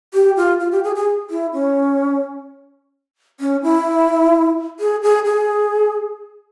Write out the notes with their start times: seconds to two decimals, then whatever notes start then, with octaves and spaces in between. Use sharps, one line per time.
0.14 G4
0.37 F4
0.60 F4
0.72 G4
0.84 G#4
0.95 G#4
1.30 E4
1.53 C#4
3.40 C#4
3.63 E4
4.80 G#4
5.03 G#4
5.26 G#4